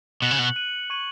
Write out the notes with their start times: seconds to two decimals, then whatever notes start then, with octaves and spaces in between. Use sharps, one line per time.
0.22 B2 F#6 C#7 F#7
0.31 C#3
0.39 B2
0.56 F#6 D#7 F#7
0.90 C#6 G#6 D#7 F#7